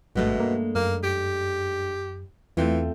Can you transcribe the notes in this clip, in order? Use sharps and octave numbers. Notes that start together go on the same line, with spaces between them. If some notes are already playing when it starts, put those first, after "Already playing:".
G#1 G2 B2 G#3 A3
A#3
F#2 A#3
G4
E2 E3 A3 C4 F4